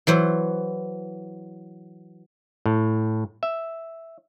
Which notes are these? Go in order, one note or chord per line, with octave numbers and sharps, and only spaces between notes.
E3 F#3 C5
A2
E5